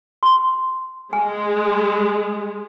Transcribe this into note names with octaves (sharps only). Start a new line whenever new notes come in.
C6
G#3 G#5